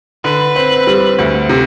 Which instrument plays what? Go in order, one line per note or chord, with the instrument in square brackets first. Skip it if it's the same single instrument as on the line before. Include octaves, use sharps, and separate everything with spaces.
[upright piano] D3 [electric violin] B4
[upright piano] C4
G3
D2
C3